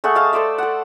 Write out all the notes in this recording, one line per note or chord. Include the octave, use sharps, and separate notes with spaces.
A3 G#4 F#5 C#6
D#5 F5 A5
A4 C5 D5 E5
A4 F#5